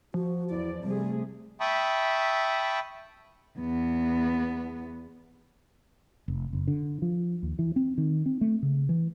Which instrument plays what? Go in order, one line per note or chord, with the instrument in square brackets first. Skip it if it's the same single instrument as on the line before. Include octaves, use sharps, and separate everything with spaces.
[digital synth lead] F3 [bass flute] F#4
[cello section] E2 D5 [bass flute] E4
[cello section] C3 A3 G#4 [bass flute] G3
[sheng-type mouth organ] E5 G5 A5 B5 C#6 D#6
[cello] E2 B3
[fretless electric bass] F1
F#1
D3
F3
D#2
E3
C4
D#3
C4
A3
C#3
E3